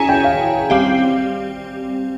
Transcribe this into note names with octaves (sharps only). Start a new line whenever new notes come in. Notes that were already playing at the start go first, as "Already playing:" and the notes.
Already playing: C#4 E4 G#4 C#5 G#5 A#5
G5
F5
G3 C4 G4 F5